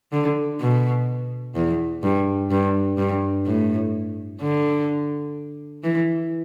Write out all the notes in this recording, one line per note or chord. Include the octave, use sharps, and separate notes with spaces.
D3
B2
E2
G2
G2
G2
A2
D3
E3